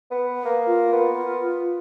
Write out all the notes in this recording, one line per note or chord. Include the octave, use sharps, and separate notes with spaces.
B3
A#3
F4
B3